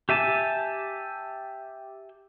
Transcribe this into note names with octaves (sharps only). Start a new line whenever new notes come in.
G4 E5 G#5 A5